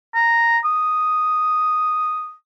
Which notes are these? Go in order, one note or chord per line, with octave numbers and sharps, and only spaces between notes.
A#5
D#6